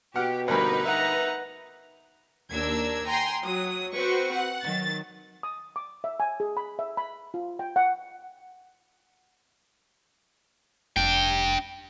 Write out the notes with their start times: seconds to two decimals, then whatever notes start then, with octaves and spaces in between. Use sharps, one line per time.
0.16 B2 G4 F#5 F6
0.48 D2 G2 D#4 A#4 B4 B5
0.86 E5 F#5 A#5
2.51 D#2 D4 A#4 E6 G#6
3.08 G5 G#5 A#5 C6
3.44 F#3 D#6
3.94 C4 F#4 B4 C5 C#6
4.33 F#5
4.64 D#3 F#3 A6
5.43 D#6
5.76 D6
6.04 E5
6.20 G#5
6.40 G#4
6.57 B5
6.79 E5
6.97 B5
7.34 F4
7.59 G5
7.76 F#5
10.96 F1 D4 G5